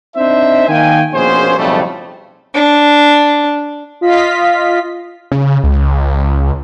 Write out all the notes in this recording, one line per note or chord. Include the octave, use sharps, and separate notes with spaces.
C4 D4 D#4 C5 E5
D#3 A#3 F5 G5 G#5
A#1 B2 A#3 C#4 G#4 C5
B1 F2 A2 C#3 G3 A3
D4
F4 D#5 B6
C#3
C#2